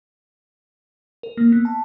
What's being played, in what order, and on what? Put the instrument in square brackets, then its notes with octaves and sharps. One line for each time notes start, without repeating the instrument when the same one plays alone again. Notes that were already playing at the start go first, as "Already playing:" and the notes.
[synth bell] A#4
A#3
B3
A5